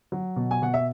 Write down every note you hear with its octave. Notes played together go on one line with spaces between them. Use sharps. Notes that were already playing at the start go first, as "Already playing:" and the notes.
F#3
B2
G#5
B2 F#5
E5